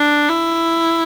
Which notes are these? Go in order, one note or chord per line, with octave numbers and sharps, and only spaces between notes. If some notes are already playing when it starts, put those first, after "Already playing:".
Already playing: D4
E4